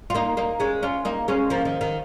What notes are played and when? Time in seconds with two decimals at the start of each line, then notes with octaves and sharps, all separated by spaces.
0.10 F4
0.15 A#3 D#4
0.37 A#3 D#4
0.60 G#3 C#4
0.83 C#4 F4
1.05 A#3 D#4
1.28 G#3 C#4
1.50 F3 A#3
1.65 D#3
1.81 D#3